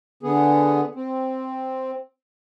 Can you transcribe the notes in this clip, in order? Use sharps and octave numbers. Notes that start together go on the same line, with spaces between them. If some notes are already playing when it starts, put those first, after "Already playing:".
D3 B3 G#4
C4